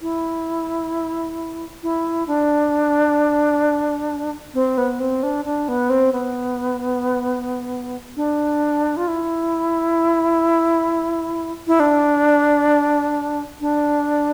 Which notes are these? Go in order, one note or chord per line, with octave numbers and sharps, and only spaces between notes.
E4
E4
D4
C4
B3
C4
D4
D4
B3
C4
B3
D4
F4
E4
E4
D4
D4